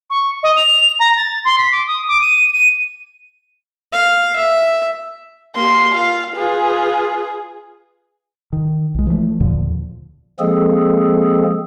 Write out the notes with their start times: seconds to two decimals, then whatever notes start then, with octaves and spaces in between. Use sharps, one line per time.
0.10 C#6
0.43 D#5
0.56 F7
1.00 A#5
1.17 A6
1.45 C6
1.58 B6
1.72 D6
1.87 D#6
2.08 D6
2.21 D#7
2.53 D#7
3.93 F5
4.36 E5
5.56 A#3 G4 C6
5.94 F4 F5
6.36 F4 G#4 B4
8.53 D#3
8.95 B1 G#3
9.07 E3 F3 G#3 A3
9.40 D#2 A#2 D3 F3
10.39 F3 G#3 A#3 C4 G#4 A4